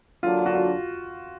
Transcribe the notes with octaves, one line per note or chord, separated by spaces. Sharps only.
D3 F#3 A#3 D4 F4
F#4
F4